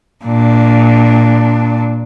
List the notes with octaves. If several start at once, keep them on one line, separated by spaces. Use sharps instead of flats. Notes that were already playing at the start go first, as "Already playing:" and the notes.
A#2 D4